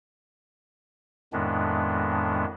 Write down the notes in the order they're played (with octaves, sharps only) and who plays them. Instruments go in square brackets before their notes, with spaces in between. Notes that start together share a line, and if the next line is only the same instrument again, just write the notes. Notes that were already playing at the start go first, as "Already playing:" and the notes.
[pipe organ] F2 A2 D#3 G#3 B3 D4